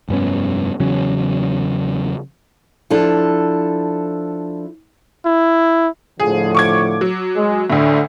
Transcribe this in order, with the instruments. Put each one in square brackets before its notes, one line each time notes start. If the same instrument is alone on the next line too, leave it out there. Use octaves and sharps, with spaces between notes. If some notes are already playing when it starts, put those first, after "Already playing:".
[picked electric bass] F1 G2 B3 C#4
E2 C#3 F#3 C#4
[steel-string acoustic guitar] F3 D4 E4 A4
[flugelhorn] E4
[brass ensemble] A2 D3 F3 [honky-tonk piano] G#4
[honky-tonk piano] C#6 D6 G#6
F#3
[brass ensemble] G#3
[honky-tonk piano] D2 A2 [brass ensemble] D3